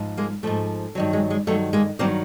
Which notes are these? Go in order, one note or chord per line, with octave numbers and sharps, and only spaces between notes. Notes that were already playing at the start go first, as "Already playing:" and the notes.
Already playing: G#2 F3
G#3 A#3
G#2 F3 A3
G2 D#3 F#3
G#3
G#3
G2 D#3 F#3 A3
G#3 A#3
G2 D#3 F#3 A#3 C4